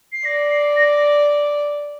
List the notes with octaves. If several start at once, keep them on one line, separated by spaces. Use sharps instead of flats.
C7
D5 A#6
C7
A#6